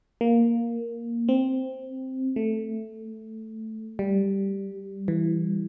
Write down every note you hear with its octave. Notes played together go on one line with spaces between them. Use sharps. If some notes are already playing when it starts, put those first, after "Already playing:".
A#3
C4
A3
G3
E3